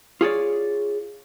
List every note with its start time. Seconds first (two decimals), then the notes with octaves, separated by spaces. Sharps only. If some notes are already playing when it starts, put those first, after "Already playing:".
0.21 F4 G#4 C#5 D5